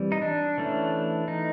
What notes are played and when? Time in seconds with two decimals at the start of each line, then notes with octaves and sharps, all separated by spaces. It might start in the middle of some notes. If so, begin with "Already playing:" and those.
Already playing: E3 G3 C4
0.12 D#4
0.22 D4
0.58 E3 A3 C#4
1.28 D#4